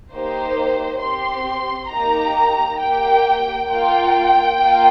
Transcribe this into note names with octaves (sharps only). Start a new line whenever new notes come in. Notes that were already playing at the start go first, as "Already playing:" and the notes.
A#3 D#4 G4 C5
C4 G4 C6
A#3 D#4 G4 A#5
A#3 G4 G5
A#3 F4 G5
A#3 F4